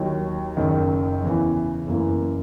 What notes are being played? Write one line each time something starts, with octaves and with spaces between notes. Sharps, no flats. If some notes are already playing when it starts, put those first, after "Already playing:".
Already playing: D#2 D#3 F#3
F#1 F#2 D#3
E2 C#3 E3
F#1 F#2 E3 A#3